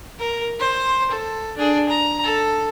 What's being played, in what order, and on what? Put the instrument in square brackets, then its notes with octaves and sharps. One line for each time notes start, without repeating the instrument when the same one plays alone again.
[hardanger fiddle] A#4
C5 C6
A4
D4 G#4
A#5
A4